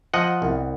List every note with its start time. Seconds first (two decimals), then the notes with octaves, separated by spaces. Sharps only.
0.14 F3 D#5 F#5
0.42 C2